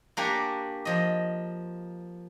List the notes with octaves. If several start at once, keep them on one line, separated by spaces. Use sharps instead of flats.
A#3 D4 G4 C#5 G#5
F3 D#5